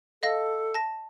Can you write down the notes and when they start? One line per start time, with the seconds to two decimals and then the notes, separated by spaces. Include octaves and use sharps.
0.23 A4 D#5 F5 A#6
0.74 A5 A#6